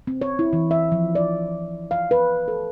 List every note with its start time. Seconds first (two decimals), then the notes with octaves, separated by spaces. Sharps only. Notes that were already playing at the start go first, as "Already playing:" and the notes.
0.07 C4
0.22 C#5
0.39 E4
0.53 E3
0.71 E5
0.92 F3
1.15 D5
1.91 F5
2.11 B4
2.48 A4